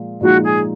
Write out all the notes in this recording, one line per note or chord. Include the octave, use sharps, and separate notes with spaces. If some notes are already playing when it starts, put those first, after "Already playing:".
Already playing: A#2 F3 G#3
A#2 F3 G#3 D#4 F#4
G#4